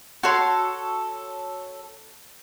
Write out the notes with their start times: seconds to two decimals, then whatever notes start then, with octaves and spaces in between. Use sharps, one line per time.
0.23 F#4 A4 C#5 C6